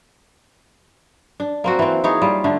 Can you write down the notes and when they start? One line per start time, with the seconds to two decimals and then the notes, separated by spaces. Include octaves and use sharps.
1.40 D4
1.64 A#3 C4 F#4
1.79 E3 C4
2.04 E3 D#4 G#4 C#5
2.22 G3 F4
2.44 D3 A3 D4